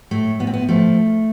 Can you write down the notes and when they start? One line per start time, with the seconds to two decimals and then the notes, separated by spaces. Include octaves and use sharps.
0.11 A2 A3
0.40 A2 B3
0.47 C4
0.54 B3
0.68 F3 A3